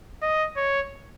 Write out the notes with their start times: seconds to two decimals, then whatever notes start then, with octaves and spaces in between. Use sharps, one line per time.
0.22 D#5
0.57 C#5